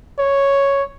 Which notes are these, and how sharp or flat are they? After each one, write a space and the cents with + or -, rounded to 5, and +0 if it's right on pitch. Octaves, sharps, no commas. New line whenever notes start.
C#5 +0